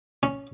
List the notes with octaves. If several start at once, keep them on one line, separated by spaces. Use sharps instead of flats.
C#4